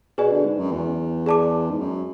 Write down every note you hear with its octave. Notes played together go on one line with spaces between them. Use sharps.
B2 G#4 B4 D5 G#5
D3
G#2
F#2
E2
G#4 D5 A5 D6
G#2
F#2